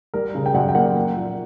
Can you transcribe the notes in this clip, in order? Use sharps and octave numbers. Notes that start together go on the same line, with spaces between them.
G3 A#4
C#3
G5
F#2 F#5
G5
A#3 F#5
A#3
A#2